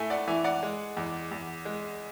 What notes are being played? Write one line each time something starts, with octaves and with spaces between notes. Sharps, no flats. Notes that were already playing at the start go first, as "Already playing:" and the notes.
Already playing: A2 A3 E5 G#5
D5 F#5
E3 E5 G#5
D5 F#5
G#3
E2
E2
G#3